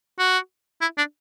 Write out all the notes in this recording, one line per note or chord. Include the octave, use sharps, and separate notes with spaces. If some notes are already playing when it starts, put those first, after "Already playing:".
F#4
E4
D4